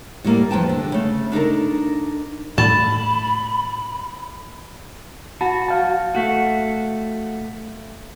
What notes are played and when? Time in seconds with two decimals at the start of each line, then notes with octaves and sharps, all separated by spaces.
0.24 A2 G3 A#3
0.51 E2 F3 B4 G5 A5
0.69 D3
0.92 C#3 A3
1.32 D4 D#4 A4 A#4
2.58 A2 A3 A5 B5
5.41 F#4 A5 B5
5.68 F5 A5
6.15 A3 F#4